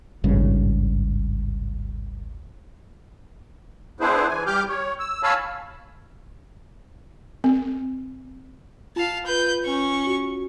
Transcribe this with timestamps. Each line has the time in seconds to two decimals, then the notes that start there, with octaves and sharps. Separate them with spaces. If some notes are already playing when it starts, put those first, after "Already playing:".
0.24 D1 G#1 G2 C#3
4.00 B3 D4 E4 G#4 B4 C5
4.28 E3 G#5
4.46 G3 G4 D6 F6 G6
4.69 C#5
4.99 E6
5.23 C#5 F5 G#5 A5 B5 E6
7.44 C4
8.96 F4 F5 A5
9.25 B4 G6
9.63 C#4 C#6
10.07 F#4